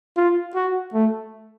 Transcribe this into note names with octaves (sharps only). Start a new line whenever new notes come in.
F4
F#4
A3